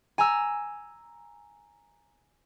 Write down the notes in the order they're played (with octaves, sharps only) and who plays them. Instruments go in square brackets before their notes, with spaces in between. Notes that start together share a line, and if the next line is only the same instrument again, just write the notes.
[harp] G#5 A#5 E6